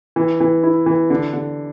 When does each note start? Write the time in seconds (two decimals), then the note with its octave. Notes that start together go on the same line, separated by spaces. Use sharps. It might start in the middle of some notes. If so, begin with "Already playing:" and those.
0.16 E3
0.40 E3
0.63 E4
0.86 E3
1.10 D3
1.33 D3